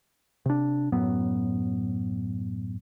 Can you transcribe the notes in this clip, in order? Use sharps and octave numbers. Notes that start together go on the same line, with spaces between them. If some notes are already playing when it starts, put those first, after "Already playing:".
C3 D4
F#2 A2 F#3 B3